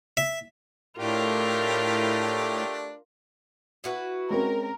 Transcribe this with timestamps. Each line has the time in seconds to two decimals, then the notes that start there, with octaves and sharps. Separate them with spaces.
0.17 E5
0.98 A2 A3 D4 F4 G4 A#4
3.84 E4 F#4 B4
4.30 G#3 C4 C#4 A#4